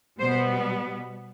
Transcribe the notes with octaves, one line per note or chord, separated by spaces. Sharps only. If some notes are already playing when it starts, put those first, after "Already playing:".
B2 G3 B3 C5